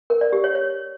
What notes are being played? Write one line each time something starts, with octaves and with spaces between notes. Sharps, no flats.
A#4
D5
G4
C#5
C#5